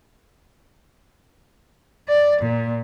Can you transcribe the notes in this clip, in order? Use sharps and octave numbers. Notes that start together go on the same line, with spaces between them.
D5
A#2